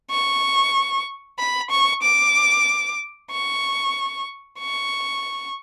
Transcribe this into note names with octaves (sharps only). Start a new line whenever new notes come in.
C#6
B5
C#6
D6
C#6
C#6